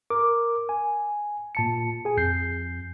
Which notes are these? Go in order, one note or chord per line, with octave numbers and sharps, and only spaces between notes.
A#4 D6
G#5
A#2 A5 C#7
G#4 G#5
F2 G6 C7